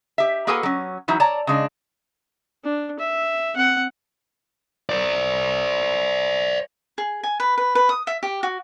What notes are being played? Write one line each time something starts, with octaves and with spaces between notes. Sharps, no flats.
G4 E5
A#3 F#4 G#4 A4 B4 G#5
F#3 C#4
E3 F#3 D#4 E4
C#5 D5 A5 A#5
C#3 G#3 D4
D4
E5
C4 F#5
C5 D5
G#4
G#5
B4
B4
B4
D#6
E5
G4
F#4